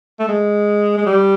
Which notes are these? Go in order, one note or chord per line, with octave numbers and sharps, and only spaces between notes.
A3
G#3
G#3
G3